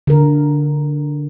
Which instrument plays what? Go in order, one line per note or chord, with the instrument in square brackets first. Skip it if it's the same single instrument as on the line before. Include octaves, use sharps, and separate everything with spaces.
[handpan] D3 A#4